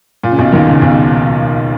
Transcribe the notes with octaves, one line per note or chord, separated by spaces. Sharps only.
A#2
C#3
B1 B2
D#2 D#3
C#2 C#3
B1 B2